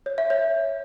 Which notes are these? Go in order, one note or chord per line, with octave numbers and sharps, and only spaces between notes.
C#5
E5
C#5